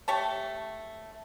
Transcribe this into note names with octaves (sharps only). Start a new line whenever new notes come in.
A3 G4 C#5 A5